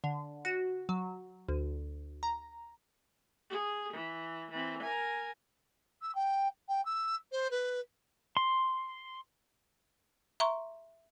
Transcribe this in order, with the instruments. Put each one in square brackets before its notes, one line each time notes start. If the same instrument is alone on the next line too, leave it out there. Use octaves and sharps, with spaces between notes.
[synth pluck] D3
F#4
F#3
D2
A#5
[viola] G#4
E3
E3 C4
A#4 G#5
[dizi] E6
G5
G5
E6
C5
B4
[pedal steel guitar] C6
[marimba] E5 A#5 C6 C#6